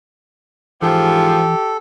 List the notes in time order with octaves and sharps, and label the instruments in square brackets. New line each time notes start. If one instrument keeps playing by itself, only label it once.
[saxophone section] G#2 F3 [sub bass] E3 [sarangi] G4 [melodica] A4